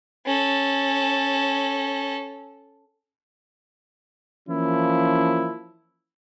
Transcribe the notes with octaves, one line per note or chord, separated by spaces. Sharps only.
C#4 A4
E3 F3 A#3 C#4 E4